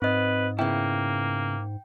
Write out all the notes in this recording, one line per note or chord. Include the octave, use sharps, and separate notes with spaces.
G#2 C4 B4 D#5
C#3 A#3 B3 E4 G5